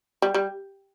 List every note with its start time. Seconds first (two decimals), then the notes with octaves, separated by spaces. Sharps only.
0.22 G3
0.34 G3